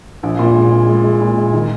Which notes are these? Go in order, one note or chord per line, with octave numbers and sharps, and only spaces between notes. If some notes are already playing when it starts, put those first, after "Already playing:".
A#1
A#2
G#3
G#3
G#3
G#3
A#2
G#3
D#3